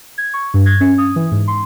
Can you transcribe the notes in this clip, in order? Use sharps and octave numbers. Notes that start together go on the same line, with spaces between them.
G#6
C#6
G2
G#6
C#4
D#6
E3
G#2
C6